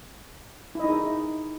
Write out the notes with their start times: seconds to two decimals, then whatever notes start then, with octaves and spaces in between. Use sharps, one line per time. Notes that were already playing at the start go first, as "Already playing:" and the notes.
0.75 E4
0.80 D#5
0.84 D#4
0.88 G#4